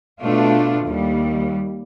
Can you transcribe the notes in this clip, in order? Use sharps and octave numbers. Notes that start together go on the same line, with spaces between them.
B2 A3 D4 F4
D#2 G3